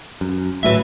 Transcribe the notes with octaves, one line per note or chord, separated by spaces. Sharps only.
F#2
G#1 A2 F#3 B4 E5